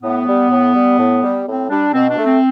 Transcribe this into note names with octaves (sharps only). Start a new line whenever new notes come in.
A2 B3
G3
A2
G3
A2
G3
A2 C4
G3 D4
B2 C4
D4
A3
C4